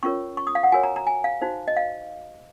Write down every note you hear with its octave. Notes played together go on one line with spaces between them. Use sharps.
C#4 F4 A#4 C#5 C#6
C#6
D#6
F5
F#5
F#4 A#4 C#5 G#5
A#5
A#5
G#5
F5
D#4 F#4 C5
D#5
F5